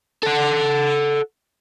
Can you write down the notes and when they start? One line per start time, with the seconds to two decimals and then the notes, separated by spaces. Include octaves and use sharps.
0.23 A4 F#5